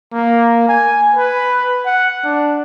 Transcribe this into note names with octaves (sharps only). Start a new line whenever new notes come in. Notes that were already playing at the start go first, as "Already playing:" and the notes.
A#3
G#5
B4
F#5
D4